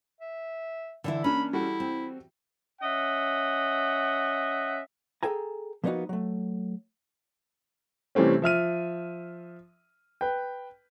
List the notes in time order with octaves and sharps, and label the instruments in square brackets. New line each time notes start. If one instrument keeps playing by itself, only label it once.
[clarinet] E5
[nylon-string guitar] D3 E3 E4
[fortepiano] A#3 D4 [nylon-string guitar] C#4 [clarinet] B5
[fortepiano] G3 F#4 A4 [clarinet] E4
[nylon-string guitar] C4
[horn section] C#4 D#5 E5 F#5
[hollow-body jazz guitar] G#4 A4 G5 G#5 A#5
F3 A#3 B3 D4 D#4 F#4
F#3 A3
[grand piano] C3 E3 G3 A3 C4 C#4
F3 E5 F6 D#7
B4 G5